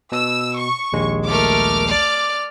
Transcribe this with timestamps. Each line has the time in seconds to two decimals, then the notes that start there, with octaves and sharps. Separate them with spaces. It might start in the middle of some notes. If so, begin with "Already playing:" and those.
0.12 B2 E6
0.57 C#6
0.93 A#1 D#2 G#3
1.27 A3 A#4 D6 F6
1.87 D5